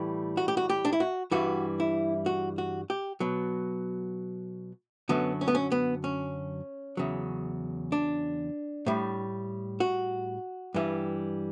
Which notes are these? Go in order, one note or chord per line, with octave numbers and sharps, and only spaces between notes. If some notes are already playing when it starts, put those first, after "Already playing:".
Already playing: A2 E3 G3
F#4
G4
F#4
G4
D4
E4
F#4
G2 E3 G3 F#4
E4
F#4
F#4
G4
B2 F#3
F#2 D3 F#3 B3
C#4
B3
C#4
B3
C#4
E2 C#3 F#3
D4
A2 G3
F#4
G2 E3 G3